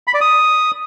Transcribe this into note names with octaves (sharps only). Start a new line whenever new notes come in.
B5
D5
D#6